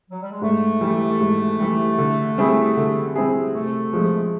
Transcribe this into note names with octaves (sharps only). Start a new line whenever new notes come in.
F#3
G3
G#3
G#2 A3
E3 G3
G#2
E3 G3
D3
G3 C4 E4 G#4
D3
G3 C4 E4 G#4
C3 A3
F3 G#3